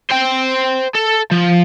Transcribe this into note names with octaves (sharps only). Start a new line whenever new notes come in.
C5 G5
A4
F3